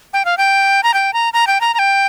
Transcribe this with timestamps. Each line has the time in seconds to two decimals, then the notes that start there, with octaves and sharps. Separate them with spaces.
0.13 G5
0.25 F5
0.38 G5
0.83 A#5
0.94 G5
1.13 A#5
1.33 A#5
1.47 G5
1.61 A#5
1.74 A#5
1.79 G5